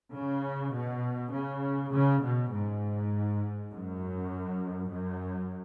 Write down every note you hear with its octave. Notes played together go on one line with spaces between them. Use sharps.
C#3
B2
C#3
C#3
B2
G#2
F#2
F#2